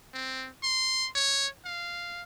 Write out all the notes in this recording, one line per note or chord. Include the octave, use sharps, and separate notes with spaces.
C4
C6
C#5
F5